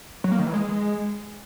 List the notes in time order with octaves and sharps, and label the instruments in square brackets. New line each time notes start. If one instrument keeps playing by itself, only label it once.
[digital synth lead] F#3
A#3
D#3
E3
G#3